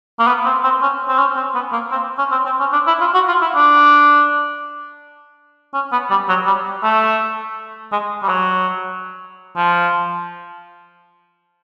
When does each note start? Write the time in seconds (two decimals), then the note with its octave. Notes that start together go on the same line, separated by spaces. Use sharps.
0.19 A#3
0.27 B3
0.46 C4
0.64 C4
0.82 C#4
1.09 C4
1.19 C#4
1.36 C4
1.55 B3
1.73 A#3
1.92 C4
2.19 C#4
2.32 C4
2.46 C4
2.60 C#4
2.73 D4
2.87 E4
3.01 F4
3.14 F#4
3.28 F4
3.42 E4
3.55 D4
5.74 C#4
5.92 B3
6.11 G3
6.29 F#3
6.46 G3
6.84 A3
7.92 G#3
8.23 G3
8.29 F#3
9.57 F3